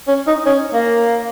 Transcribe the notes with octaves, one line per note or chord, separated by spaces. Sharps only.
C#4
D#4
C#4
A#3